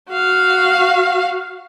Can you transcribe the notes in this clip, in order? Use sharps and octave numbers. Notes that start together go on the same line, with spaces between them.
F#4 F5